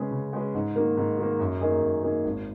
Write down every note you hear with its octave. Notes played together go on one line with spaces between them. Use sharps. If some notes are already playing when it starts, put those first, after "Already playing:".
Already playing: C#3 G#3 C#4 G#4 B4
C#3
G#3 C#4 G#4 B4
G#2
D#3 A#3
G#2
D#3 A#3
F#2
D#3 A#3 D#4 G#4
F#2
D#3 A#3 D#4 G#4
G#1